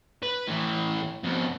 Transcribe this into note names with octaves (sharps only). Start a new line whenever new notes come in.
B4
A2 E3
F2 B2